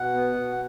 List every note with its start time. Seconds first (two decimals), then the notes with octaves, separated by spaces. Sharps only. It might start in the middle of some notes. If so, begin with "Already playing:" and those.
Already playing: B2 F#5
0.14 B3
0.36 B2